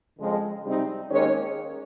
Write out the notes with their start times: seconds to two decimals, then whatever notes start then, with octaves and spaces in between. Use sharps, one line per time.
0.19 F2 C#3 F3 G#3
0.65 C3 G3 C4 D#4
1.11 D#2 D#3 G#3 C#4 C#5